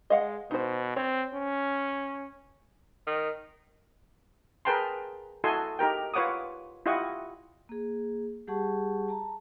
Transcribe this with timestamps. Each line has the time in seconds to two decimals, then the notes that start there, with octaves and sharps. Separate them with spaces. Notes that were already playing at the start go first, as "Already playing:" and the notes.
0.10 G#3 D#5 F5 F#5
0.51 B2 D#4 C5
0.96 C4 C#5
1.35 C#4
3.07 D#3
4.65 G#4 A#4 B4 G5 A5 C6
5.44 E4 F#4 A4 D#5 G#5 C6
5.79 D#4 G4 A#4 G5
6.14 F4 B4 C#5 F#5 D6 D#6
6.86 E4 F4 G4 D#5 F#5 C#6
7.69 A#3 G#4
8.47 G3 G4 G#4 F#5 A5 C#6
9.08 A5 A#5